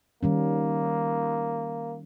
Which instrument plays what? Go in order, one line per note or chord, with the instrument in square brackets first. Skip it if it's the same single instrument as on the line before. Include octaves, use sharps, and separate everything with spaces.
[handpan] D#3 G3 C#4 [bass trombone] A#3